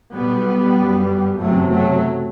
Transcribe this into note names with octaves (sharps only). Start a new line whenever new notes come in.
B1 B2 G3 B3
G1 F#2
F#1 E2 C3 F#3 A3
F#3 A3